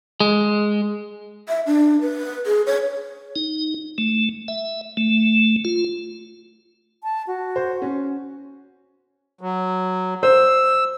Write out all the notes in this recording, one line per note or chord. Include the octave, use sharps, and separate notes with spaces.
G#3
E5
D4
B4
G#4
C#5
D#4
A3
E5
A3
F4
A5
F#4
C5
C#4
F#3
C5 E6